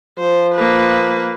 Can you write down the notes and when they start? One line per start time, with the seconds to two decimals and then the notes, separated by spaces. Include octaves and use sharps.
0.19 F3 C5
0.55 A#3 B4